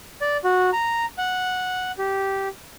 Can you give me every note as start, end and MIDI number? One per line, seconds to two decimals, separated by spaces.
0.21 0.37 74
0.44 0.70 66
0.73 1.05 82
1.18 1.92 78
1.98 2.48 67